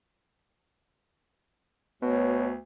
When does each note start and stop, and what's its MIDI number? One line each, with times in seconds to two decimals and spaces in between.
2.02 2.59 38
2.02 2.50 47
2.02 2.55 59
2.02 2.45 73